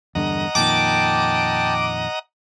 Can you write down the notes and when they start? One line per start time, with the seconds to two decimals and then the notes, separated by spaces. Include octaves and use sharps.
0.15 E2 G2 D3 D#5 F#5 A#5
0.55 F2 A#2 D#3 G5 A5 D6